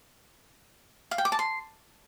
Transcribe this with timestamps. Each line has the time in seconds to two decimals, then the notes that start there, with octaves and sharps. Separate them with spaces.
1.11 F5
1.18 G5
1.25 D6
1.32 A5
1.39 C6